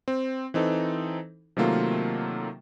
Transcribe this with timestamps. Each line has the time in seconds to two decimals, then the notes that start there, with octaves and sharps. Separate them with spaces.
0.08 C4
0.54 E3 C4 D#4 A4
1.57 C3 D#3 F#3 A3 A#3 F4